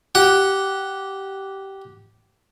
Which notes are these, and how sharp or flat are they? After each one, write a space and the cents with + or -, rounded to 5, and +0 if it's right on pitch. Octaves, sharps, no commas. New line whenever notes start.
G4 -15 F#5 +0